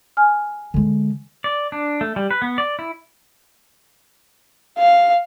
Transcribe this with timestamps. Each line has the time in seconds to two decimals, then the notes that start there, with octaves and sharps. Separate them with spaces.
0.17 G#5 F6
0.74 D3 G#3
1.44 D5
1.72 D4
2.01 A3
2.16 G3
2.31 B4
2.42 B3
2.58 D5
2.79 E4
4.78 F5